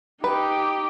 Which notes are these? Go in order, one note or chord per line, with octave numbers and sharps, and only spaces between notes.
D#4 G4 B4